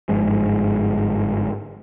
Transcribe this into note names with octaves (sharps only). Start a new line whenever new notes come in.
G1 G#2 F3 G#3